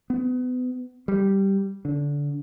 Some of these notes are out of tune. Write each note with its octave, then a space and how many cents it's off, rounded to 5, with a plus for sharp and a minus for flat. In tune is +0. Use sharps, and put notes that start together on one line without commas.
B3 +30
G3 -5
D3 -20